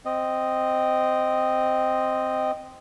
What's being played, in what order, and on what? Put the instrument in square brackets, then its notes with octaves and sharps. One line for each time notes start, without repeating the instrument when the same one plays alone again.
[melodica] C4 D#5